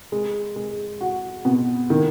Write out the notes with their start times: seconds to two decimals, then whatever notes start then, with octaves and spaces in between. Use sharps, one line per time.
0.12 G#3
0.56 G#3
1.01 F#4
1.45 B2
1.90 D#3